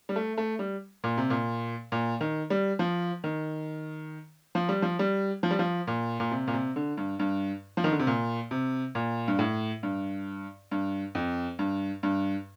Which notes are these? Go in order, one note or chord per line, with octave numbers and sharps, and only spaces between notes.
G3
A3
A3
G3
A#2
C3
A#2
A#2
D#3
G3
F3
D#3
F3
G3
F3
G3
F3
G3
F3
A#2
A#2
C3
A#2
C3
D3
G2
G2
F3
D#3
D3
C3
A#2
C3
A#2
G2
A2
G2
G2
F2
G2
G2